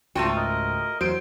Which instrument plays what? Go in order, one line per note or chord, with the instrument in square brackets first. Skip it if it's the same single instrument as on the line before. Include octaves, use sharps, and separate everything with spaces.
[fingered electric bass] C#2 G#2 [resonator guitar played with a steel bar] A3 F4 F#4 [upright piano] G5
[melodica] A#4 D#5
[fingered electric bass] E2 [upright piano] F#3 D7 [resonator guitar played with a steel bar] C5